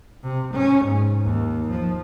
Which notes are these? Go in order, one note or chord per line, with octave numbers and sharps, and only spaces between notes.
C3
C#4
G#2
D#2
F3